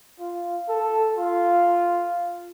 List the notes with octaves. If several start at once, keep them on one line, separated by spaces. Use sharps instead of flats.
F4
A4
F4